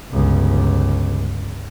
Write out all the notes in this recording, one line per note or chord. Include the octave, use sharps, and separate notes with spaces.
G1 C#2